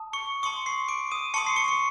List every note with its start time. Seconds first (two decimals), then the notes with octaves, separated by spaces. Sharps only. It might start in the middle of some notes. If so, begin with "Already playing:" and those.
Already playing: A5 D#6
0.13 C#6 C#7
0.43 A5 C6 C#6 D#6 C#7
0.66 C6 C7
0.88 D6 D7
1.11 D#6 D#7
1.34 A5 C6 C#6 D#6 C#7
1.47 C7
1.56 C#6 C#7
1.68 C#7